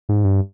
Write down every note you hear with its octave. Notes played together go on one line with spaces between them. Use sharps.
G#2
G2